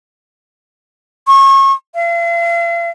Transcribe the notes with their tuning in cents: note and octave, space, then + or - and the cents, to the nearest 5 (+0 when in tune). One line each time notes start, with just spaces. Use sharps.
C#6 -30
F5 -45